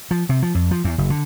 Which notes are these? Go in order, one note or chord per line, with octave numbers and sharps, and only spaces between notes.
F3
C3
F3
F2
F3
E2
F#1
D3